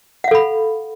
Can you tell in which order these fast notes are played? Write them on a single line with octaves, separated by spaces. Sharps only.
F#5 F5 A4 B5